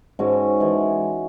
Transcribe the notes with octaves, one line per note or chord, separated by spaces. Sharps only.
G#2 G#3 C#4 F#4
E3 G#3